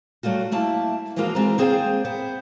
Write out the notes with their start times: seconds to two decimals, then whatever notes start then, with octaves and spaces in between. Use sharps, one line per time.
0.23 F#3 G3 A3 F4 F#4
0.52 A3 A#3 E4 A5
1.16 E3 F3 G#3 A#3 F4 F#4
1.35 E3 G#3 C4 D5 A#5
1.58 A#3 C4 G#4 C5 D5 G5
2.05 B3 C5